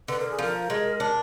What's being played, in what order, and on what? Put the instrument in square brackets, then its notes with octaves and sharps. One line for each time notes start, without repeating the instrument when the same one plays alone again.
[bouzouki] D3 [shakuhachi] B4
[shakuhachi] A#4
G#4
[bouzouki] F3 [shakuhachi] A#4
[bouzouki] G#3
D4